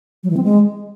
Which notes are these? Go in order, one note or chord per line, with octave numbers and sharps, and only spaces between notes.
F#3
E3
C4
G#3